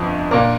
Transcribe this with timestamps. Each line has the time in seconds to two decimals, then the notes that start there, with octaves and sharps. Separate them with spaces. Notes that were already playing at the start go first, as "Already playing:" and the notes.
Already playing: G1 F2 F3
0.31 A#2 A#3 D4 A#4